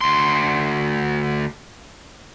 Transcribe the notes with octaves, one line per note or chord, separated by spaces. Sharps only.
D2 C6